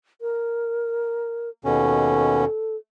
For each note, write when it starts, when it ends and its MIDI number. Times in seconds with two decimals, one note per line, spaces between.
0.21 1.49 70
1.65 2.45 39
1.65 2.45 47
1.65 2.45 61
1.65 2.76 69